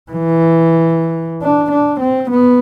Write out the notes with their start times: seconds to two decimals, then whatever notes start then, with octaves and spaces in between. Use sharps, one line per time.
0.11 E3
1.42 D4
1.71 D4
2.00 C4
2.30 B3